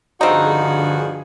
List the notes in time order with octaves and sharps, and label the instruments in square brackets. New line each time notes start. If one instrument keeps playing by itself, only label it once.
[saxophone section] G2 F3 F#4 [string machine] D3 G#4 [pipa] C4 D#4